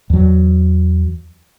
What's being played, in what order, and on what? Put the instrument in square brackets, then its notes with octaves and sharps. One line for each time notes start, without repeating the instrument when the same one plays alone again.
[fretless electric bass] E2 F#3